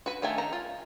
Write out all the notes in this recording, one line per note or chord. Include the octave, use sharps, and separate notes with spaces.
F#4 B4
D#3 A3 G5 G#5 A#5
D#3 A#5
F4